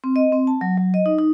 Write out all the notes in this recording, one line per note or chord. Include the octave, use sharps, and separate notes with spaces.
C4
D#5
C4
A5
F#3
F#3
D#5
D#4
D#4